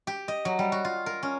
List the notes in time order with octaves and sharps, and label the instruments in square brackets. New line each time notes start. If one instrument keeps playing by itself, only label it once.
[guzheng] G4
D#5
F#3
G3
F#4
F4
A#4
C#4